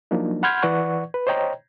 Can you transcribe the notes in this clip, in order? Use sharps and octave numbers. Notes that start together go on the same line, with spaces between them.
F3 F#3 A#3 D4 D#4
F#5 B5 C6 F6 G6 G#6
E3 B4 D5 F#5 C#6
B4
C5 C#5 D#5 G5 A#5